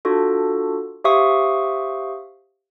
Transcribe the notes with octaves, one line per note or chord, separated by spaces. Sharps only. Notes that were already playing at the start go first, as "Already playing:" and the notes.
D4 F4 F#4 A4
G4 C5 E5 F5 C#6 D#6